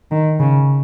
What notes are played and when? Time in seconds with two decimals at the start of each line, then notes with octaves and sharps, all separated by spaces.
0.11 D#3
0.40 C#3